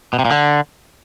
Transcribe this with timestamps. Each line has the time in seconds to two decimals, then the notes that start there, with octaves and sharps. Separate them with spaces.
0.13 B2
0.19 C3
0.25 A#2
0.31 D3